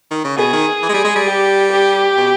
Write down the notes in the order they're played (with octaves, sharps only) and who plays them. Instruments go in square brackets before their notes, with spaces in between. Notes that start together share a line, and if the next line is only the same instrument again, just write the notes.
[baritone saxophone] D#3
C#3
[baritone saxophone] B2 [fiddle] G#4
[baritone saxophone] D#3
E3
G#3
G3
G#3
G3
[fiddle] G4
G4
[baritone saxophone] B2